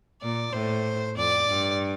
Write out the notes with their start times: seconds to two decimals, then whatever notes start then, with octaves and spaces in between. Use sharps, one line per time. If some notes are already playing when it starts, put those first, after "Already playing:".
0.22 A#2 D5
0.53 A2 C5
1.16 F2 D5
1.48 G2